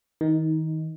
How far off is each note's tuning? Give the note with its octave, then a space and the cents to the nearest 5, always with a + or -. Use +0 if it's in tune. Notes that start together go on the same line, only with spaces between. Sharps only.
D#3 +30 D#4 +5